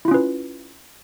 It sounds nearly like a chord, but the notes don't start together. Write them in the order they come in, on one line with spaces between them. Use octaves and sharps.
E4 F4 C#4 B4